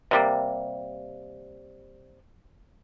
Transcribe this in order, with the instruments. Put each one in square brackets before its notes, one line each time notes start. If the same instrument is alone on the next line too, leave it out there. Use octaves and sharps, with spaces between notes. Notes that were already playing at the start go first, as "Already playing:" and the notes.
[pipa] C3 G3 A#3